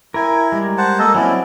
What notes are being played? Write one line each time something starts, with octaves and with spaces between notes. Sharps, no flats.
E4 A#4 G#5
G3 G#3 A#4
C5 F#5 A5
A#3 A4 D#5
F#3 C4 C#4 E4 D5